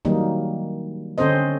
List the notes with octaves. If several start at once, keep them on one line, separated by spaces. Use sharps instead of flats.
D#3 F#3 G3 A#3 D#4
D3 C4 C#4 A4 C5 D#5